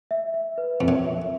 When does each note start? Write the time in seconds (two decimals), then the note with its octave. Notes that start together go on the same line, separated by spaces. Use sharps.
0.11 E5
0.34 E5
0.58 B4
0.81 F2 B4
0.88 F#2
1.04 E5